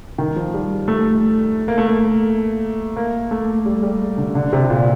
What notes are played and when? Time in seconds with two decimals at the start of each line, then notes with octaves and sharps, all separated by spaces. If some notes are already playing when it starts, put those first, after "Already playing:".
0.18 D#3
0.36 F3
0.54 G3
0.88 A3
1.68 A#3
1.78 A3
1.88 A#3
2.96 A#3
3.31 A3
3.66 G3
3.83 G3
4.18 D3
4.35 D3
4.53 C3
4.64 C3
4.70 A#2